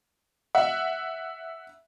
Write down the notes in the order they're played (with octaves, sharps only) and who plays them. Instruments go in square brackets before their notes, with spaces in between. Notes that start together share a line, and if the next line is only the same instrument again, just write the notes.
[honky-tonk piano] E5 F#5